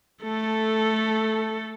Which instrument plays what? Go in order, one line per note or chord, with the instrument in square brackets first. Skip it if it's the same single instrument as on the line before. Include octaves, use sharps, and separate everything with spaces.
[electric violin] A3 A4